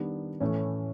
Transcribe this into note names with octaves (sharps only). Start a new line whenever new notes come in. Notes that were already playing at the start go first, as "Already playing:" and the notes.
Already playing: D#3 G3 B3 D4
A2 E3 A3 C#4